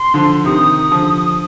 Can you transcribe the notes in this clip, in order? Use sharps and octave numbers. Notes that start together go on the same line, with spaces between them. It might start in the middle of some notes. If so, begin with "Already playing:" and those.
Already playing: C6
D3 F3
C3 D#3 D#6
D3 F3